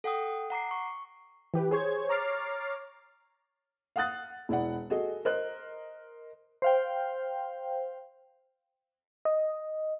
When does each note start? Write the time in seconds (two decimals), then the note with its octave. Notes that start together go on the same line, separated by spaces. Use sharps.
0.04 A4 F#5 G5 D#6
0.50 F#5 A#5 D6 C7
0.71 C#6
1.54 E3 G4 B4
1.71 G#4 C5 C#5 G#6
2.09 C#5 A#5 D6 F6 A6 C7
3.96 F5 F#5 D#6 F#6 A6
4.49 E1 E4 D5 F#5
4.90 F#4 G#4 A4 D#5
5.25 A#4 C5 D#5 F#6
6.62 C5 F5 G5
9.25 D#5